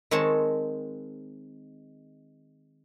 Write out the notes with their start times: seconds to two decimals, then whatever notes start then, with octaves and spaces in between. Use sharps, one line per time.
0.11 D#3 G#3 C4 C#5 D#5 A5